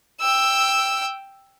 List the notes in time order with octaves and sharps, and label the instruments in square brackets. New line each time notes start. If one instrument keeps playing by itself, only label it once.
[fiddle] G5 E6